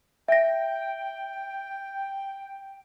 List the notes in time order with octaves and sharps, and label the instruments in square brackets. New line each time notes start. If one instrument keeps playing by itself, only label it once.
[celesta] E5 A#6 [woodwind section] G5